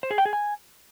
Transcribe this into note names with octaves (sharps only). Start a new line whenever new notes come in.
C5
G#4
G5
G#4
G#5